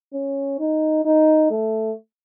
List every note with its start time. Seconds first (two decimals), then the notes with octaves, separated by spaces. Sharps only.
0.14 C#4
0.59 D#4
1.05 D#4
1.51 A3